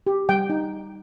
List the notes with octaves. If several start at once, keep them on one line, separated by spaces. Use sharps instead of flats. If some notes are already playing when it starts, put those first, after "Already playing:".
G4
G3 G5
D#4